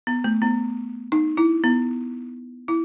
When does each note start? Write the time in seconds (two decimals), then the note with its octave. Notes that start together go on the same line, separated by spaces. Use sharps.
0.07 B3
0.24 A3
0.42 B3
1.12 D#4
1.37 E4
1.64 B3
2.68 E4